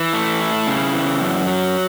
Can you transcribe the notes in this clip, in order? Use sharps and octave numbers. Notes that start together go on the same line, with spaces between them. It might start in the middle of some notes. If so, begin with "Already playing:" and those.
Already playing: E3
A3
E4
C#3
E3
F#2
F#3